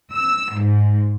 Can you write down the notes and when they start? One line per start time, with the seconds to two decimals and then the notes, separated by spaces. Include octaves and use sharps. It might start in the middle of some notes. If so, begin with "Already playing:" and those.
0.13 E6
0.57 G#2